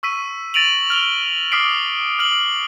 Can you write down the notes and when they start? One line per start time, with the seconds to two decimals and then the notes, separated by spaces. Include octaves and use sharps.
0.03 C#6 E6 B6 D#7
0.54 A6 A#6 D7 D#7 F7 F#7
0.90 F6 F7 G7
1.52 D6 D#6 F6 B6 C7 D7
2.19 F6 D7 F#7